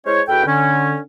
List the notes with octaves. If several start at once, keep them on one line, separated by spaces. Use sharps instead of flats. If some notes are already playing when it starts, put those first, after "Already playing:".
G#3 E4 C5 C#5
E2 F#4 A4 B4 G5
D3 C#4